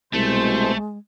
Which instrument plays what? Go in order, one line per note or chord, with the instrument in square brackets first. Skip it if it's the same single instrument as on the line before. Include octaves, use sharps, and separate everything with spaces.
[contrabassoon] C2 [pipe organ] B2 C5 [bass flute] G#3 [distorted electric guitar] A3